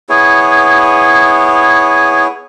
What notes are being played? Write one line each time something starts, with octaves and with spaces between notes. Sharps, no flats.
B3 E4 G#4 C#5